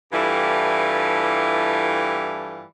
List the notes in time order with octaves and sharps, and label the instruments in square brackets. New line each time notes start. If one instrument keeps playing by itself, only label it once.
[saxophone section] G2 E3 G3 A3 E4 F4